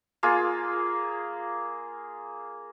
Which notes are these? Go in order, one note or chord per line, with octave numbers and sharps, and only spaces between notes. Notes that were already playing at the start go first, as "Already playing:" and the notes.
A#3 F4 G#4